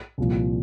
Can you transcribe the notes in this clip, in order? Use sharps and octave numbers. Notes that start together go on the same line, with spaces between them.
C2 A#2 F3